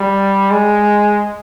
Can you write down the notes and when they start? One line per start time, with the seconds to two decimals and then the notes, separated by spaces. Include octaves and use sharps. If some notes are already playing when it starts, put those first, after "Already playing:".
Already playing: G3
0.51 G#3